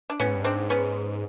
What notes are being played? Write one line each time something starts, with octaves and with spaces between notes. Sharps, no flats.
D4
A2 B3 C#4
G#2
G2
G#2 C4 D4
B3 C#4